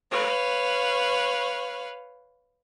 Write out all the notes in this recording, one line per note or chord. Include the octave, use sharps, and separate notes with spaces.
B4 C#5 F5